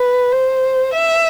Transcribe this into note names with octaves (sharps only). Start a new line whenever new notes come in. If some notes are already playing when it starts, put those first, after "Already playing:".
Already playing: B4
C5
E5